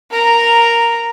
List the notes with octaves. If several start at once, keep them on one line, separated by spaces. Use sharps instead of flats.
A#4 A#5